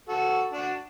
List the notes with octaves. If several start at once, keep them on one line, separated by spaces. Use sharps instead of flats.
F#4 A4
D4 F#4